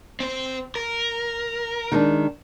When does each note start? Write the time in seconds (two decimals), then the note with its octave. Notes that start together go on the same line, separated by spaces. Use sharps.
0.20 C4 C5
0.75 A#4
1.92 D#3 G#3 D4